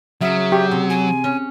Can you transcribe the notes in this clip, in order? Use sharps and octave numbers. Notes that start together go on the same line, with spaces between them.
C#3 F#3 E5
G4
C3
G#5
C#4